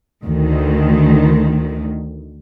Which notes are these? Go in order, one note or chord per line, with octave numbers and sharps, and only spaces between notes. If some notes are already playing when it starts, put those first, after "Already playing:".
D2 D#3